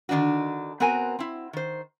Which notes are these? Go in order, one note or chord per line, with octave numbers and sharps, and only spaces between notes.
D3 D#3 D4 D#4 F#4
B3 C4 F#4 A#4 G#5
C4 E4
D#3 C5